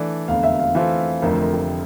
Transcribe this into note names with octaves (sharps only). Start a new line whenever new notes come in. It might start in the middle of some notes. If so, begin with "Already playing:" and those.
Already playing: E3 A3 D4 A4 D5
F1 E2 D3 F5
E5
F5
E3 A3 C4 F4 A4 F5
F1 F2 D3 F3 A3 A#4
A#4
G4